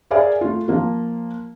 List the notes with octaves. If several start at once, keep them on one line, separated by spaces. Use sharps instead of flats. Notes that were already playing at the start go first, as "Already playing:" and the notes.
G#4 A#4 D5 E5 F5 G#5
A3 F4
F3 A#3 F4